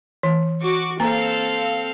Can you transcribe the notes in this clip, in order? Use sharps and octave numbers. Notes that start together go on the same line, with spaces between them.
E3
F#4 C#6 D6
A#3 C4 A4 F5 A#5